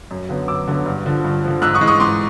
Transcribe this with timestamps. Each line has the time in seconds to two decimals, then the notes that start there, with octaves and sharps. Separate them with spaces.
0.11 F#2
0.29 D3 F#3 B3
0.48 F#2 D6 E6
0.67 D3 F#3 B3
0.86 G2
1.05 D3 F3
1.24 G2
1.44 D3 F3
1.62 G#2 E6 F#6
1.74 C#6 D#6
1.81 E3 G#3
1.87 C#6 D#6
2.00 G#2 C6 D6